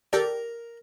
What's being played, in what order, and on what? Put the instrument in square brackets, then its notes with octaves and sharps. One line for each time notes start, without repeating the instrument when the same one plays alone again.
[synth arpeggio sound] G4 A4 D5 [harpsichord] A#4